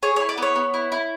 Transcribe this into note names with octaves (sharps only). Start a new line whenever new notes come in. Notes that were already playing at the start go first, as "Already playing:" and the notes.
G#4 C#5
E4 C#5
D5
B3 C#5
B3
E4
E4